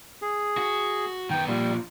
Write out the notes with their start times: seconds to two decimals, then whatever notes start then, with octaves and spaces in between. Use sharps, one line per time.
0.22 G#4
0.58 F#4
1.31 D#3 B3 G5
1.47 A#2 F3 G3